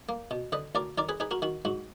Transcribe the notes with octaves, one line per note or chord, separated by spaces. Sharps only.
A#3
B2
D3 B4 D#5
D2 A#4 D5
D#3 A#4 D5
G#4 B4
D#4 G#4 B4
F#4 A#4
D#3 F#4
G#2 F#4